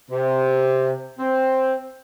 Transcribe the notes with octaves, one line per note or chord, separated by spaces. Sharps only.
C3
C4